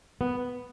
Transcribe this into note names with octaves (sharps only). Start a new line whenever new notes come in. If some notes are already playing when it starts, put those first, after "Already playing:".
B3